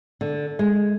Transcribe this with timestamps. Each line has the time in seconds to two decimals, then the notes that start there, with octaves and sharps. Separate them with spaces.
0.21 D3
0.59 G#3